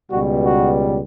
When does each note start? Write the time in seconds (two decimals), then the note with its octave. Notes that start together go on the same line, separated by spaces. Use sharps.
0.10 C#2 B2 G3 F#4
0.43 F#4